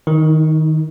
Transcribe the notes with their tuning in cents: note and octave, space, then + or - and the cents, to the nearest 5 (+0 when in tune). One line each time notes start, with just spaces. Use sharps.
D#3 +5 D#4 +45